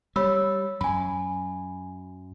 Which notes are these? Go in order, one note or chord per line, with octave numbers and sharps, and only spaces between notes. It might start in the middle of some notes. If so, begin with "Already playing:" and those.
G3 C#5 B5 E6
F#2 G#5 B5